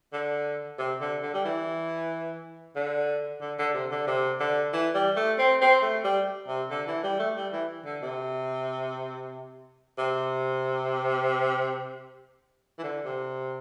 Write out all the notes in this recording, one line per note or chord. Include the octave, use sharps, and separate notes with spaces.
D3
C3
D3
D3
G3
E3
D3
D3
D3
C3
D3
C3
D3
E3
G3
A3
C4
C4
A3
G3
C3
D3
E3
G3
A3
G3
E3
D3
C3
C3
E3
D3
C3